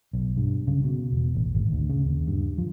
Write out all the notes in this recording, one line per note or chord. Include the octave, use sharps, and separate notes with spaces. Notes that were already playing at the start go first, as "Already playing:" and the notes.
B1
G2
C#3
B2
E1
A1
G#1
D2
C#3
D#2
G2
F3